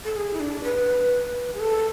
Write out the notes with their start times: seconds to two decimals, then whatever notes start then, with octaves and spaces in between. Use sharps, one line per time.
0.05 A4
0.16 G#4
0.33 E4
0.40 D4
0.64 B4
1.55 G#4
1.60 A4